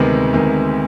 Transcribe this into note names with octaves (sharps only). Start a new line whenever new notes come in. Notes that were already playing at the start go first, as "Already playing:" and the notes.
Already playing: D2 C3 D#3 G#3 B3
D2 C3 D#3 G#3 B3